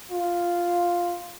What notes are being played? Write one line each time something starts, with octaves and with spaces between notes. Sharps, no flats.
F4